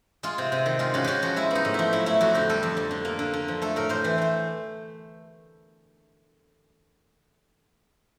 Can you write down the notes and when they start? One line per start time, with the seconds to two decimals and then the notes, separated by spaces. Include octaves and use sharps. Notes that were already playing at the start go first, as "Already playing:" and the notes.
0.23 G#3 F4
0.38 C3
0.52 C3
0.66 D#3
0.79 G#3 F4
0.94 C#3 F#4
1.04 C#3 F#4 G4
1.22 F3 F#4
1.36 G#3 E4
1.51 B3 D#4
1.65 A2
1.74 F3 E4
1.93 F#3 E4
2.06 A3 E4
2.21 F2 F#4
2.35 D3 G4
2.49 G3 A4
2.63 F2
2.77 F2
2.91 D3
3.05 A#3
3.19 D3
3.33 D3
3.48 F3
3.62 A3 A4
3.76 A2 A#4
3.89 A2 C5
4.04 E3
4.18 A3 C5